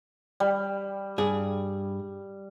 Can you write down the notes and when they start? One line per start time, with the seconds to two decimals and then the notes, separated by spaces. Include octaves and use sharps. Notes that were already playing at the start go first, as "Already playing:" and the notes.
0.40 G3
1.18 G2 G#4